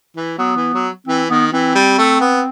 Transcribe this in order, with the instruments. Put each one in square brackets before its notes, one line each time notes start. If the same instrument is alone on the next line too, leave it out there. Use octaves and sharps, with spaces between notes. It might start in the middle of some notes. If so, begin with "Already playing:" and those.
[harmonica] E3
[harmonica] F#3 [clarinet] B3
[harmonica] E3
F#3
[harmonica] E3 [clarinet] C4
[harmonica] D#3 [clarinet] B3
[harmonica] E3 [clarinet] C4
[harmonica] G3
A3
B3